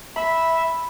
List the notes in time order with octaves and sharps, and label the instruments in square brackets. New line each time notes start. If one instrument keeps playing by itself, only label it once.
[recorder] E5 [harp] B5